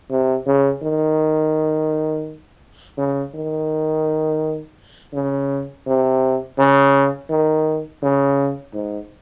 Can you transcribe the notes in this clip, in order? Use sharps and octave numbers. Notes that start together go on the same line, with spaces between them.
C3
C#3
D#3
C#3
D#3
C#3
C3
C#3
D#3
C#3
G#2